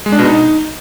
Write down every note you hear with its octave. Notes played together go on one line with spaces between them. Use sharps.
G#3
D4
B2
D#4